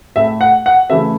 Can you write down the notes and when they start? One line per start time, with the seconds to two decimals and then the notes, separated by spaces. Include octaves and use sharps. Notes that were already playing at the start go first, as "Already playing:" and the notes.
0.16 A2 A3 E5
0.41 F#5
0.66 F#5
0.90 C#3 E3 A3 E5